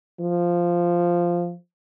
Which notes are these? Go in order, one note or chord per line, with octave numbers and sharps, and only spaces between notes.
F3